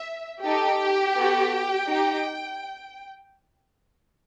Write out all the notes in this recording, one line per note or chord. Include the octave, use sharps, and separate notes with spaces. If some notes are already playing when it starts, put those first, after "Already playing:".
Already playing: E5
D#4 G4 A4 G5
B3 F#4 A4
D#4 G4